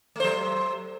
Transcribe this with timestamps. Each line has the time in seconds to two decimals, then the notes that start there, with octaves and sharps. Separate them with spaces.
0.16 A3
0.20 C5
0.24 F#3